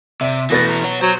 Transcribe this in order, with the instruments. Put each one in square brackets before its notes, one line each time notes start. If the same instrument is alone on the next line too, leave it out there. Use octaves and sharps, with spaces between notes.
[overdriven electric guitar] C3 [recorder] D5 [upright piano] E5
[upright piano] B2 B4 A6 [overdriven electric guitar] E3 A3 [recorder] A#6
[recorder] A#5
[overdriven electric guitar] C#5 F#5
[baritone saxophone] F#3 [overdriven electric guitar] C5 [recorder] C#5